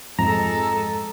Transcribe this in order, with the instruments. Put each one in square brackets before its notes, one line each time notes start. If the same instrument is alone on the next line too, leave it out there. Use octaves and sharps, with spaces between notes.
[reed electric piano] F2 G#2 [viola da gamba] G#3 A4 [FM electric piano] A#5